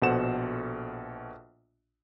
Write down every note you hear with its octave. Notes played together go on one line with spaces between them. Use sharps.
A#1 B2 A4 C5 F#5 E7